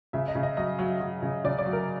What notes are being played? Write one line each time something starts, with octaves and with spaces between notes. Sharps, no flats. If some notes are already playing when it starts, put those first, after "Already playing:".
C#3 E5
D#5
C#3
D#5
F#3 D#5
F#3
F#3
C#3
C#3 D5
D5
F#3
A#4